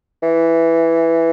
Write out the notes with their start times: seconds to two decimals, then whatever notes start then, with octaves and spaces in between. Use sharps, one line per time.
0.22 E3